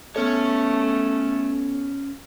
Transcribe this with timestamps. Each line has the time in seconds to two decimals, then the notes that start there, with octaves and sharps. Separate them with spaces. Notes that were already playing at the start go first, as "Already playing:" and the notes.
0.16 A3 B3 C#4 A4 C#5